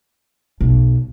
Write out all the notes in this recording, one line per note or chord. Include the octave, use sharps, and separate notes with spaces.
B1